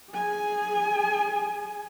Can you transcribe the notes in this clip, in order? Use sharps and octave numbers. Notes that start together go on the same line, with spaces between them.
G#4 G#5